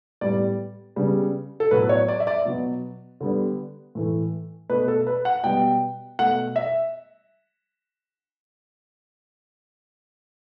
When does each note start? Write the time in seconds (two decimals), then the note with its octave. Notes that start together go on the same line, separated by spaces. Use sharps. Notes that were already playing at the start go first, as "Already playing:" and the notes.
0.21 A2 G3 B3 D5
0.96 C#3 G3 B3
1.60 A4
1.71 A2 F#3 B3 B4
1.89 C#5
2.08 D5
2.20 E5
2.27 D5
2.45 B2 F#3 B3
3.20 D3 G3 B3
3.95 A2 E3 A3
4.70 B2 A3 B4
4.88 A4
5.07 B4
5.25 F#5
5.44 B2 G3 B3 G5
6.19 B2 A3 F#5
6.56 E5